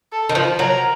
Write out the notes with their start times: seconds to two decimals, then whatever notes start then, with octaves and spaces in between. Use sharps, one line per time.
0.12 A4
0.29 D#3
0.35 F3
0.59 F#3 A#4